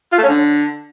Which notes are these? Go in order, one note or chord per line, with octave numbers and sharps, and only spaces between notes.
F4
A3
C#4
D3